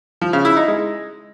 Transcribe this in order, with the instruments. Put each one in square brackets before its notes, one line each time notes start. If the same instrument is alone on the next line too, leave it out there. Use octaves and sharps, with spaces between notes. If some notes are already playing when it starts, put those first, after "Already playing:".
[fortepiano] F3
C#3
E4
D#4
G#3